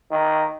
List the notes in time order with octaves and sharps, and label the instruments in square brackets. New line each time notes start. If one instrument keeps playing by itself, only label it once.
[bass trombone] D#3